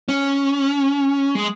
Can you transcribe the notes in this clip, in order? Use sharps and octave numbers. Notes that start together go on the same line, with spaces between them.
C#4
G#3